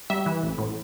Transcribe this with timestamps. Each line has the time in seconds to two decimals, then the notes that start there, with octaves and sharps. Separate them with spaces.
0.10 G3 E5
0.26 E3
0.43 A1
0.58 A2